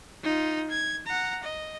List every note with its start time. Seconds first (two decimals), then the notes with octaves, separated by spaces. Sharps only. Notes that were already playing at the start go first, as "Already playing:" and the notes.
0.23 D#4 F4
0.70 G#6
1.06 F#5 A#5
1.44 D#5